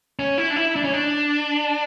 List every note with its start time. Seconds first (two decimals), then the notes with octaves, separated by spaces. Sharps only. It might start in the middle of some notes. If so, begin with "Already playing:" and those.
0.19 C#4
0.38 E4
0.50 D4
0.56 E4
0.76 D4
0.84 C#4
0.93 D4